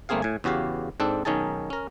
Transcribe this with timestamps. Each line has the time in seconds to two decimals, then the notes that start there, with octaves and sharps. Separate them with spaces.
0.09 G1 A3 A#3 C4 G#4 F5
0.22 A2 G#5
0.44 E2 C#3 F#4 G4 F5
1.00 G#2 C4 D4 A4
1.25 B1 D#3 C#4 D#4 G#4 A5
1.70 C#4 A#4